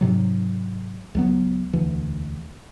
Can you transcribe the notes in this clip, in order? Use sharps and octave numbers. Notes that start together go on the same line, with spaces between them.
G#2 C3 F#3
C#2 F#3 B3
E1 D2 E3